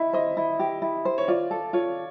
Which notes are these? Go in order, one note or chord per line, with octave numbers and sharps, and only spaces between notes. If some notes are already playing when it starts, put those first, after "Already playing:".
Already playing: E4 D#5 E5
C5 D#5
E4
G4
E4
C5
C#5
F4 D5
A4
F4 C#5